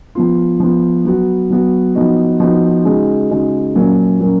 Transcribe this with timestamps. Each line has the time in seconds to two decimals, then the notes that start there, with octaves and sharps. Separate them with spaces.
0.15 F3 B3 F4
0.60 F3 B3 F4
1.05 F#3 B3 F#4
1.50 F#3 B3 F#4
1.95 F3 B3 D#4 F#4
2.40 F3 B3 D#4 F#4
2.85 C#3 G#3 D#4 F#4
3.30 C#3 G#3 D#4 F#4
3.75 A#2 F#3 A#3 C#4
4.20 A#2 F#3 A#3 C#4